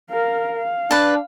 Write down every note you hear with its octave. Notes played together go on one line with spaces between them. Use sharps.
A#4 F5
F5
D4 B4 A5